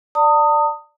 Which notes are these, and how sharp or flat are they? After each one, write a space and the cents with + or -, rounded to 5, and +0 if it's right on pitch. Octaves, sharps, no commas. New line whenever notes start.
D5 +0 A5 +45 D#6 +0